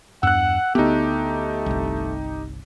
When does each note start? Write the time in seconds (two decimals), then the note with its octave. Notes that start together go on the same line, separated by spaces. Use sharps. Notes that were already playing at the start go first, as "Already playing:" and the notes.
0.23 E2 G2 F#5 E6 F#6
0.75 D2 A3 B3 D#4 G4
1.66 G1 C2